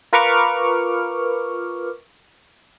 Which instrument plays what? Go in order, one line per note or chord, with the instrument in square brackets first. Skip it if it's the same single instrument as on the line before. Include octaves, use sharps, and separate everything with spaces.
[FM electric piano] F4 A#4 B4 C#6 D6 F6